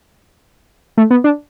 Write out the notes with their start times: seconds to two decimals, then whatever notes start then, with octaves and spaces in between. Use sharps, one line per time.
0.97 A3
1.11 B3
1.24 D4